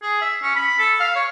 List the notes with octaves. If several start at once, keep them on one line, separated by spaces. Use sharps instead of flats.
G#4
E5
C#4
B5
A4
F5
C#5